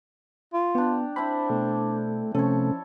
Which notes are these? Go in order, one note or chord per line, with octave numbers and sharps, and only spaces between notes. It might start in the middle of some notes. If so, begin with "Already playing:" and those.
F4
B3 D4 G4
C4 D4 E4 B5
B2 A3
C3 F3 A3 C#4 A4 C#5